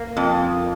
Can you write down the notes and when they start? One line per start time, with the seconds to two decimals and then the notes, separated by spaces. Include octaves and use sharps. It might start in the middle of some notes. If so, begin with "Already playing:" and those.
Already playing: A#3
0.17 F2